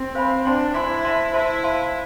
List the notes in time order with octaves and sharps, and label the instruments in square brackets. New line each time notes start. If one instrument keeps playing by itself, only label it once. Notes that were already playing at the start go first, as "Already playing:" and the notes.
Already playing: [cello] C4
[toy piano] C5 F5 G#5 B5
[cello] D4 [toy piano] C5 G#5 C6
[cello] E4 [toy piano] C5 G#5 C6
[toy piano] C5 E5 A5 C6
[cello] E4 [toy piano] C5 E5 A5 C6
[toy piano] C5 F5 A5 C6